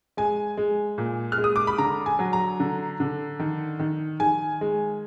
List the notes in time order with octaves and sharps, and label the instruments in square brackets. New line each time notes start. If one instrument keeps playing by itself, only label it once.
[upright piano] G#3 G#5
G#3
A#2
F6
G#3
D#6
D6
B5
D3 A#5
G#5
F#3
A#5
D3
D3
D#3
D#3
D#3 G#5
G#3